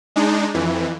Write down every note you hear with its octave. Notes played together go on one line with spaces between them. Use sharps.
G#3 D4 D#4
F2 E3